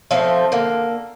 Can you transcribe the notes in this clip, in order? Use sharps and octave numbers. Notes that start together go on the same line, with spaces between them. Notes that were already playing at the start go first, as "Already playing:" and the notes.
F3 A3 C4
D3 A#3